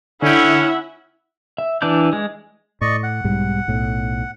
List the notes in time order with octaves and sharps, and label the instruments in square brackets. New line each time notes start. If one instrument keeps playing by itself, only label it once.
[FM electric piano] D3 G5 [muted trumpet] C#4 [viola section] E4 E5 F#5
[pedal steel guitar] E5
E3 D4 D5 G6
G#3
[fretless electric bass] A2 [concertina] D5 D#5 C#6
[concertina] F#5
[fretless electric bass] B1 G#2 G3
B1 A2